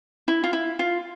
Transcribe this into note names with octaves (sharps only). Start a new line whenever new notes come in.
E4
F4
E4
F4